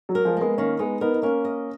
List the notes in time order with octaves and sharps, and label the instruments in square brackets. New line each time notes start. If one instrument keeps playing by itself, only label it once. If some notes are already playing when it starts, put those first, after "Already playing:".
[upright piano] F#3
[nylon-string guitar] A#4
[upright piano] F3 G#3
[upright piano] G#3 B3 [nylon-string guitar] A#3
[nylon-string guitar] D#3 [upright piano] A#3 C#4
[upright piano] G#3 B3 [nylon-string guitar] D#4
[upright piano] B3 D#4 [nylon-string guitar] A#4
[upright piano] D#4
[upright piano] A#3 C#4 [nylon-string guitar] A#4
[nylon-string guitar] D#5